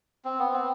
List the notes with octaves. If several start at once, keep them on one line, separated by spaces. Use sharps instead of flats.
C4
B3
C4